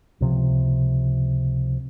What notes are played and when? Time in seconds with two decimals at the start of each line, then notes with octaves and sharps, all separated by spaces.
0.20 C#2 C3 F3